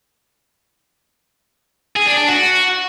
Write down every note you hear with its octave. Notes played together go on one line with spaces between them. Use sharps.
G#4
D4
D4
F#4